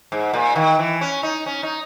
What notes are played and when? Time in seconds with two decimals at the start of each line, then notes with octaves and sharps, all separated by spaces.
0.12 G#2
0.34 A#2
0.56 D#3
0.79 E3
1.01 C#4
1.23 D#4
1.46 C#4
1.63 D#4